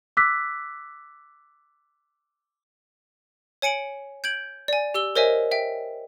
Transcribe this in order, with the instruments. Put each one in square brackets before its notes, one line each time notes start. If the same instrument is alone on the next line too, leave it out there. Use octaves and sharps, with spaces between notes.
[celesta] D6 E6 F#6 B6
[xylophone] C#5 G#5 C#7 D7 F#7
G6 G#6 D7 F#7
D5 G#5
G4 E6 G7
A#4 C5 C#5 D#5 E5 G#5
E5 G5